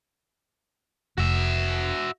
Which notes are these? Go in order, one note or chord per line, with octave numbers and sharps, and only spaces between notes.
F1 F#4 E5